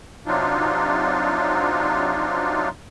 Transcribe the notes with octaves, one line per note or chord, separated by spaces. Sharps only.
C3 F#3 D4 D#4 F4